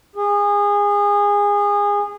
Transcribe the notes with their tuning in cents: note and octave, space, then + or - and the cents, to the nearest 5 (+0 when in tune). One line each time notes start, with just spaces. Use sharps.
G#4 -25